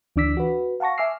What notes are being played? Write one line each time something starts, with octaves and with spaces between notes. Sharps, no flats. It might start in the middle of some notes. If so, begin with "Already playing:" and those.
D2 E3 D4 D6 E6 B6
F#4 B4
F5 F#5 A5 C#6 A#6
E5 G#5 D6 E6 F6 C7